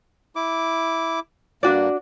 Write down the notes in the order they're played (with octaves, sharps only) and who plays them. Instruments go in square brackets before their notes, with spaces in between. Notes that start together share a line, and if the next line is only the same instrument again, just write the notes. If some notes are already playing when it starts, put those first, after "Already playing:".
[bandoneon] E4 D6
[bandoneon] G2 A#3 [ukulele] D4 F#4 D5